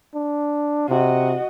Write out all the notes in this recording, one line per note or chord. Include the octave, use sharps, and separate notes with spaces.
D4
C3 F#4 D#5